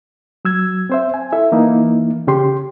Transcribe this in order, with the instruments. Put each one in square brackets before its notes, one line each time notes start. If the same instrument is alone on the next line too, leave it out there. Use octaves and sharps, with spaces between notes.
[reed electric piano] F#3 E6 G#6
C4 C5 E5
G#5
E4 A4 E5
E3 A#3 D#4 E4
C#3 C#4 G4 C6